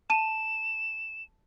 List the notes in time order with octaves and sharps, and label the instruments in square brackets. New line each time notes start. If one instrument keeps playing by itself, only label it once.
[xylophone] A5 D#7 [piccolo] E7